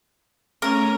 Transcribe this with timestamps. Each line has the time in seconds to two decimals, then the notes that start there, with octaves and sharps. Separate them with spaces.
0.62 A3 C#4 A#4